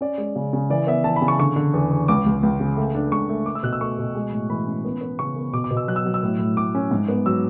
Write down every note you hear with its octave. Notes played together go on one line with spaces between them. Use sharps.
C#4 D5
G#3
C#3
C#3
E3 D5
B3 E5
E3 A5
B5
C#3
C#6
D3 C#6
D3
E2
D3
C#2 D6
C#2
C#2
C#3
A3
D4
C#2 C#6
A3
A3 D6
E6
B2 F#6
E6
A3 C#6
B2
G#3
A2
E3 B5
C#4
B3
B3
C#3 C#6
B3
B2 D6
D6
B2
E6
F#3 F#6
E6
F#3
E6
A2
A2
A2 D6
C#4
G#2
B3
F#3 E6